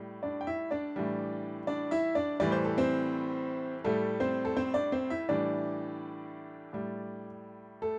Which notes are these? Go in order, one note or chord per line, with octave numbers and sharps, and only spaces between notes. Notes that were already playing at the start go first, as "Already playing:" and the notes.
Already playing: A2 G3
D4 D5
G5
E4 E5
D4 D5
A2 E3 G3
D4 D5
E4 E5
D4 D5
A2 E3 G3 D5
C5
A4
C4 C5
A2 G3 A3 A4
C4 C5
A4
C4 C5
D4 D5
C4 C5
E4 E5
A2 E3 G3 D4 D5
A2 G3
A3 A4